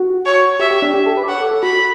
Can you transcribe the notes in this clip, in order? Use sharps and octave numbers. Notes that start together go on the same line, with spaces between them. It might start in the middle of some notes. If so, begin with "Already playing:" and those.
Already playing: F#4
C#5
G4 E5
G4
D4
G4
A4
B4
D5
C#5 F#5
A4
A4
F#4 B5